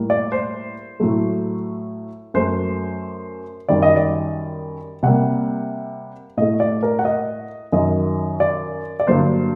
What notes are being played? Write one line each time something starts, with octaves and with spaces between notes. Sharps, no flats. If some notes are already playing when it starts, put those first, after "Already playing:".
Already playing: A2 G3 A#3
D5
C5
A2 F#3 A3
F#2 F#3 A3 C5
F#2 D#3 G3 D5
D#5
D5
C3 G3 A#3 F#5
A2 A3 D#5
D5
A#4
F#5
D#5
F#2 D#3 F#3 D#5
D5
D5
G2 D3 F#3 A#3 C5